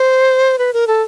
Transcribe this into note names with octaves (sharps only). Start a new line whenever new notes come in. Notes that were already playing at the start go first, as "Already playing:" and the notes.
Already playing: C5
B4
A#4
A4